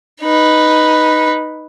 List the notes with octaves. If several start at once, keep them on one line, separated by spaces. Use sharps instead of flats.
D#4 B4